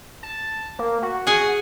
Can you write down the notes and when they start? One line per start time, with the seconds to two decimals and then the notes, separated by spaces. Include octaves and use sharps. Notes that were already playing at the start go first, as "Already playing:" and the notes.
0.23 A5
0.79 A#3
1.02 F#4
1.27 G#4 F#5 G#5